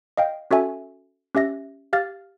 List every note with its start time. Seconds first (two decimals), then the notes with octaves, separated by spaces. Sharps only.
0.17 D#5 F5 G5
0.51 C#4 F#4 A4 E5 G#5
1.35 C#4 G4 E5 A#6
1.93 G4 F5 F6 A6